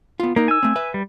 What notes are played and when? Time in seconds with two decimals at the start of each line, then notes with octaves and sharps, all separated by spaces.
0.20 B3 F4
0.36 A#3 D#4 A#4
0.48 G#5 E6
0.63 A3 C4
0.76 B4 E5
0.94 G3